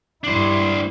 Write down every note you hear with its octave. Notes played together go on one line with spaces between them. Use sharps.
G2 D4 E4 C5